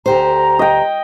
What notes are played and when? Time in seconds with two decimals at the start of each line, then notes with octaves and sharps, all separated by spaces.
0.06 D2 G4 C5 A#5
0.59 D#5 G5